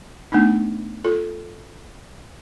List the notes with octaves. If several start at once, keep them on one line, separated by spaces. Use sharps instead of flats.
A3 B3 D4 D#4
F4 A4